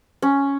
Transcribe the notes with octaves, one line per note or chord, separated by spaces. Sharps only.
C#4